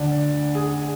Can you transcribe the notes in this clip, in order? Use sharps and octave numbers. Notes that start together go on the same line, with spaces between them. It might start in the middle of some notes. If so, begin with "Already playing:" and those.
Already playing: D2 D3 D4
G#4